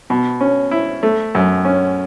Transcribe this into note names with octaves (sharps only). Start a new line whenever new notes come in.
B2
C#4
E4
A3
F#2
C#4